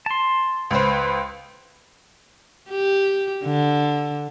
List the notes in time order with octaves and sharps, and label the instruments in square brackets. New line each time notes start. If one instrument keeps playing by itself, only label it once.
[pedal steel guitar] A5 C6
[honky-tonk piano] C#2 C5 [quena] B4
[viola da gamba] G4
D3